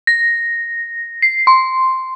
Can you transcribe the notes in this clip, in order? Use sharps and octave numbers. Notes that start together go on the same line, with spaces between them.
A#6
C7
C6